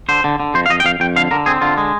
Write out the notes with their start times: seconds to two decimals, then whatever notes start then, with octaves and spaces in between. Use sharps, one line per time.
0.09 D3 C5
0.24 D3
0.40 D3
0.55 F2 C5
0.66 F5
0.70 F2 D#5
0.80 G5
0.84 F2 F5
1.00 F2 G5
1.16 D3 F5
1.31 D3 A#4
1.46 C4 G#4
1.61 D3 F4
1.78 G#3